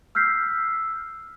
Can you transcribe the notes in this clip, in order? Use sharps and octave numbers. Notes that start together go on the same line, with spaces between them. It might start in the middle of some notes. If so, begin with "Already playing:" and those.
E6 F6 G6 B6 C7